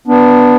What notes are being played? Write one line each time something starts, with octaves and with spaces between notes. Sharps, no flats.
B3 D4